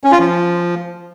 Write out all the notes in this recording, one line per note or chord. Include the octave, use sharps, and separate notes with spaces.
C#4
F4
F3